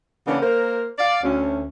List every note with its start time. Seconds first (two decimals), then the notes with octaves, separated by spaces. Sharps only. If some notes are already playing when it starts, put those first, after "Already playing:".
0.27 C#3 E3 A#3 B3 C#4 D4
0.41 A#3 A#4 C5
0.99 D5 F5
1.23 D2 C#4